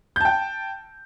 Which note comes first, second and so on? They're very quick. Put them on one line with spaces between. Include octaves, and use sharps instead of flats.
G6 A5 G5